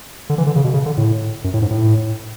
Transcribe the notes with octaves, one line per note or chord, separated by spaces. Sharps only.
D3
E3
D3
C#3
B2
C#3
D3
A2
F#2
A2
G#2
A2